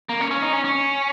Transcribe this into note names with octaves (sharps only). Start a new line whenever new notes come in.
A#3
C#4
C#4
D#4
C#4
C#4